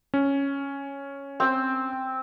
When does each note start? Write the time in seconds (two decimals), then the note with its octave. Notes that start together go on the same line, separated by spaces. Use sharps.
0.14 C#4
1.40 C4